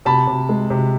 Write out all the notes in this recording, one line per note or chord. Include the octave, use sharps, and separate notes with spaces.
C3 A5 B5
C3
G#3
C3